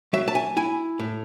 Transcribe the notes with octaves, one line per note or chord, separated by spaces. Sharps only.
F#3 E5
A5
G#5
E4 G#5
A2